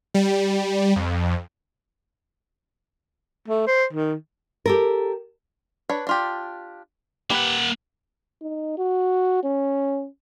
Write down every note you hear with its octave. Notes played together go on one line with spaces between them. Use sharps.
G3
F2
A3
C5
D#3
G4 A4 A#4
D4 B4 C#5
D4 F4 G4
A#3 G4 B4 F#5
D#4
F#4
C#4